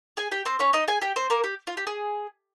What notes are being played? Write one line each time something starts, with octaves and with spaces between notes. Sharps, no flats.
G#4 G#5
G4 G5
C4 C5
C#4 C#5
D#4 D#5
G#4 G#5
G4 G5
C4 C5
A#3 A#4
G4
F4
G4
G#4